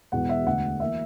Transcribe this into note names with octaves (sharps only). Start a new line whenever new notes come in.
E1 E2 B2 F#5
E5
E1 D2 D3 F#5
E3 A#3 E5